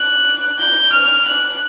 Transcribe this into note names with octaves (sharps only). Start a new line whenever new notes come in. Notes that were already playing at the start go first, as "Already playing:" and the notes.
Already playing: F#6
G6
F6
F#6